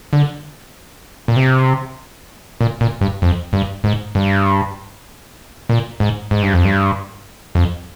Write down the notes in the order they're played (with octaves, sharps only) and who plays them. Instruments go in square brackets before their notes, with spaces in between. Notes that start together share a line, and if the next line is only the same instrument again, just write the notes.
[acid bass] D3
A#2
C3
A#2
A#2
G2
F2
G2
G#2
G2
A#2
G#2
G#2
G2
F2
G2
F2